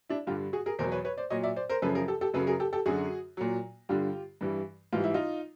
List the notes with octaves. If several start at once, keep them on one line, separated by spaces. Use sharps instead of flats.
D4 E4
G2 D3 G3 F4 G4
F#4 G#4
G#4 A#4
E2 B2 F#3 A#4 C5
B4 C#5
B4 C#5
C5 D5
A#2 F#3 C#5 D#5
D5 E5
C5 D5
A#4 C5
F#2 C#3 F3 A4 B4
G#4 A#4
G4 A4
G4 A4
F#2 C#3 F#3 A4 B4
G#4 A#4
G4 A4
G4 A4
F#2 D3 F#3 F#4 G#4
A#2 F#3
G2 D3 G3 F4 G4
G2 E3 G3
G#2 E3 G3 F4
E4
D#4 F4